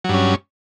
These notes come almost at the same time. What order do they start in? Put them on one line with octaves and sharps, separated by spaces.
F#3 G2 C#4